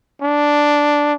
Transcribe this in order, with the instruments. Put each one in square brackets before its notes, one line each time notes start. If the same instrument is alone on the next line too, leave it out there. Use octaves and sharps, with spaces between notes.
[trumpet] D4